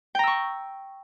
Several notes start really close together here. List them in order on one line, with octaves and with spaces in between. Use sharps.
G5 A#5 E6 C#6